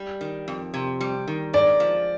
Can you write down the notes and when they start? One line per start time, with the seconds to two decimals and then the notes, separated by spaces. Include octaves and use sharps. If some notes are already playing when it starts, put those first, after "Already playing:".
Already playing: G3
0.21 D#3
0.48 F2
0.74 C3
1.01 G3
1.27 D#3
1.53 G#3 D5
1.80 F3